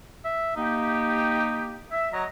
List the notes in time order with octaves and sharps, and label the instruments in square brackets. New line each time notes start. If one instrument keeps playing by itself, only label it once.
[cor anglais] E5
[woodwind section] A#3 G4 [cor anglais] D#4
[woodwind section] E5
[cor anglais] F#3 [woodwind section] D#5 A#5